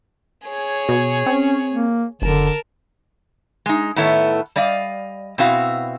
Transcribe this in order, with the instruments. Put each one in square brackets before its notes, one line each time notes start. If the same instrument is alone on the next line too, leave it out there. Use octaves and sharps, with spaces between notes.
[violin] G#4 C#5
[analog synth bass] B2
[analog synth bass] C4 [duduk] C#4
[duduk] A#3
[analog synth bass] F#1 [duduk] D3 [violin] A#4 A5
[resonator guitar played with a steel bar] G#3 D#4
A2 D#3 B3 E4 A4 C#5
G3 D5 D#5 F5
B2 C4 E4 F#4 F5